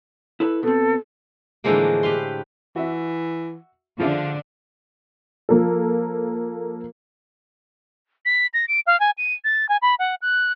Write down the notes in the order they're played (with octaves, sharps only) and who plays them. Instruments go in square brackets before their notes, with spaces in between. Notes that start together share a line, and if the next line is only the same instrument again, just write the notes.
[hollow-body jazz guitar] E4 A4 B4
[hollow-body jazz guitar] B2 C4 [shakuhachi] A4
[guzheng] A2 D3 E3 F3 G#3 A#3
G4 B4 F5 C6
[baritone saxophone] E3 [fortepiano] F#4 E5
[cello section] D3 D4 [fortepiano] F3 G#4 E5 [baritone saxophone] F4
[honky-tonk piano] F3 A#3 A4
[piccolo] B6
A#6
D7
F5
G#5
D#7
A6
G#5
B5
F#5
F#6